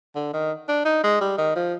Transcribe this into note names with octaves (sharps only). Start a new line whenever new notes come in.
D3
D#3
D4
D#4
G#3
G3
D#3
F3